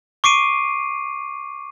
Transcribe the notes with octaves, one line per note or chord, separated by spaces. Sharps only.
C#6 D6 C7 D7 D#7